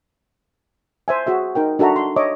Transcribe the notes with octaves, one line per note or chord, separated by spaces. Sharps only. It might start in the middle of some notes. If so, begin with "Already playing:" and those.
C5 E5 G#5
F#4 G#4 E5
D#4 A#4 G5
D4 F#4 A4 E5 A#5
C6
C#5 D#5 E5 D6